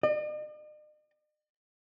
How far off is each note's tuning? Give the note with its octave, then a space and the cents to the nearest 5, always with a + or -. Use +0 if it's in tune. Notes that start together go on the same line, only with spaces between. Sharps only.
D#5 -45